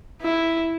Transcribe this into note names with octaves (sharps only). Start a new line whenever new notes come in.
E4